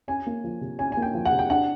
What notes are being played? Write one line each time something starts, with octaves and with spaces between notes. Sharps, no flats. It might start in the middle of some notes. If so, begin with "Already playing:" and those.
C#4 G#5
A#3
F3
C3
C#4 G#5
G#5
A#3
G5
F3
F#5
C3
G5
D4 F#5